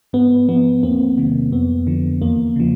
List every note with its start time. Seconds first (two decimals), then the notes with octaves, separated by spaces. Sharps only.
0.13 G#2 B3
0.49 F3 B3
0.83 E2 A#3 C4
1.17 C3 D#3 F#3
1.52 F2 B3
1.87 D3 F3
2.22 E2 A#3
2.56 C#3 F3